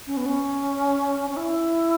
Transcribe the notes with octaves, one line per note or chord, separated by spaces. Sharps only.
C#4
B3
C#4
C#4
E4